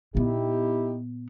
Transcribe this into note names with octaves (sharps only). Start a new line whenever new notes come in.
A#2 B3 D#4 E4 G4